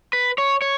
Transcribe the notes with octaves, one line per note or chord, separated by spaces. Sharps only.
B4
C#5
C#5